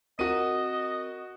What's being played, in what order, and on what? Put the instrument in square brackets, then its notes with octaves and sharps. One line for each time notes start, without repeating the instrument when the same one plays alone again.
[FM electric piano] C4 A#4 [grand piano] F#4 D#7 [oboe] D#5